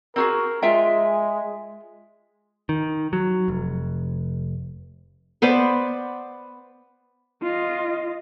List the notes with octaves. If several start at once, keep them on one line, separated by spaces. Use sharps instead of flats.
C4 F#4 G#4 A#4
G#3 F4 E5 G5
D#3
F#3
F1
B3 B4 C5 D5
F4 D#5